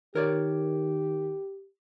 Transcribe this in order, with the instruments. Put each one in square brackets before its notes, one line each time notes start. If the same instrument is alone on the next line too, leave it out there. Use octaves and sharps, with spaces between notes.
[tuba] D#3 [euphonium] G4 [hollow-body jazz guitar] A#4 C#5 D5